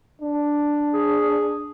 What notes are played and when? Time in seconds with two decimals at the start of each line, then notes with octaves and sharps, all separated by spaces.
0.21 D4
0.93 G#4